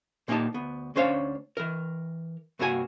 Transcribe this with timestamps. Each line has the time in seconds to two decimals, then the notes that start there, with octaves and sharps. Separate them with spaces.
0.28 A#2 A#3 C4 D#4 G4 A5
0.54 D2 B3
0.96 D2 C#4 D4 C5 C#5 F5
1.57 E3 A#4
2.59 G2 C3 A#3 F#4 B4 G#5